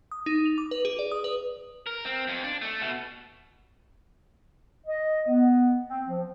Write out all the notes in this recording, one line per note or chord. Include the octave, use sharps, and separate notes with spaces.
D#6
D#4
F7
D6
B4
G#4
D5
D#6
B4
A#4
C4
F2
D4
A3
B2
D#5
B3
C4
F3